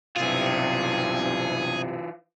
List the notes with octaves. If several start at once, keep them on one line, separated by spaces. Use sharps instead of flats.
B1 G2 C3 E3 F4 G#4